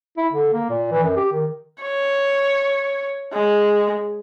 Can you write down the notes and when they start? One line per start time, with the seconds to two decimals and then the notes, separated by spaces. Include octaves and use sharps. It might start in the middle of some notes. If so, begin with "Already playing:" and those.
0.18 E4
0.33 D3
0.53 A#3
0.70 A#2
0.92 E3
1.03 F#2
1.16 G4
1.32 D#3
1.82 C#5
3.33 G#3